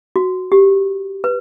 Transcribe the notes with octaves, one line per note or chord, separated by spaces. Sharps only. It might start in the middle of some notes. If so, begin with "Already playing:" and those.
F#4
G4
B4